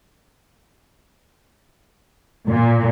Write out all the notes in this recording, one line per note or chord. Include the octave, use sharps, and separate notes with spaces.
A#2